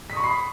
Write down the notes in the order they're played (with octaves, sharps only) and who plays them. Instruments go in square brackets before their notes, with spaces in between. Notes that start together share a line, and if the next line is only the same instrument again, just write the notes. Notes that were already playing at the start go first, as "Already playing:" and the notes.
[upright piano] B6
D#6
C#6
B5
C7